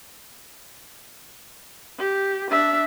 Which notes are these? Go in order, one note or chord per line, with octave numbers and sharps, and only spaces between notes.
G4
D4 E5